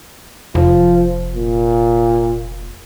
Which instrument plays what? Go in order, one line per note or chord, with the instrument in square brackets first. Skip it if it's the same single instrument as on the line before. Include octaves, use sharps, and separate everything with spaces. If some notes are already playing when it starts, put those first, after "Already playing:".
[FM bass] F1 [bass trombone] F3
[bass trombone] A#2